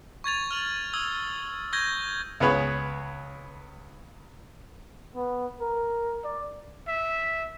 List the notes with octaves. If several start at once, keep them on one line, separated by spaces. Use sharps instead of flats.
C#6 G#6 A6 F7
F6 F7 F#7
D#6 E6 G#6 G7
C#6 G6 G#6 A#6 G7
C#2 B3 G#4 B4 C#5
B3
A#4
D5
E5